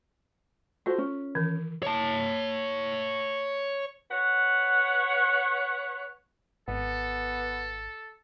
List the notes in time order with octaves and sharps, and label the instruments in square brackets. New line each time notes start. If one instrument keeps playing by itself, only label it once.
[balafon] F4 [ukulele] F#4 A4 C5
[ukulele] C#4
[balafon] D#3 E3
[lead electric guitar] C#5 A5
[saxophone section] B4 C#5 F#5
[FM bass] G#1 [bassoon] B3 [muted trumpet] A4